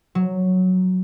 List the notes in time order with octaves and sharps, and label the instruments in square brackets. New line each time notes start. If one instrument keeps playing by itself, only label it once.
[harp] F#3